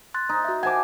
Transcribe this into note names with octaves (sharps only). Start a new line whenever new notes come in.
C6 F#6 A6
D#4
F#4 E5
C5 F#5 G#5 A5 D6